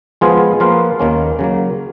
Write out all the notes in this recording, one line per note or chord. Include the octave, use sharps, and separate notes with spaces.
F3 G#3 B3 F4 G#4
F3 A#3 F4 B4 F5
D#2 D#3 A#3 C#4
C#3 F#3 A#3